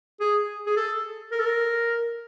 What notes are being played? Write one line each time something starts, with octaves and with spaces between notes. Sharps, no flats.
G#4
G#4
A4
A#4
A4
A#4